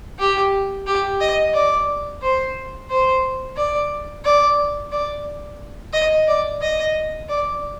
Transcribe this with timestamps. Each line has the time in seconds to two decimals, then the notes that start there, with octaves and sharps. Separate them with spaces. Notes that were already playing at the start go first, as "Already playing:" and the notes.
0.19 G4
0.87 G4
1.21 D#5
1.54 D5
2.22 C5
2.89 C5
3.57 D5
4.25 D5
4.92 D5
5.93 D#5
6.27 D5
6.61 D#5
7.29 D5